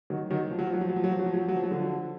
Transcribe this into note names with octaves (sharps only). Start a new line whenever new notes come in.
D#3 F#3
D#3 F#3
F3
F#3
F3
F#3
F3
F#3
F3
F#3
F3
F#3
F3
F#3
F3
F#3
F3
F#3
D3 F3